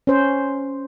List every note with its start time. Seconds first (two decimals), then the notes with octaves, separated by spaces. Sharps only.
0.07 C#4 C5